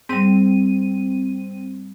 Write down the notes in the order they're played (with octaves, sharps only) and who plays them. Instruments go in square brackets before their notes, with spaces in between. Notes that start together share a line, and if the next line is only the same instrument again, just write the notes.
[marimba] G#2 G3 [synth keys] C4 D#7